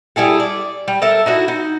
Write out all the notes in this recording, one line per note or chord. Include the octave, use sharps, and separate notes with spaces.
G3 E4 G#4 A4
D5
G3
A4 A#4 E5
D#4 E4 F#4
D#4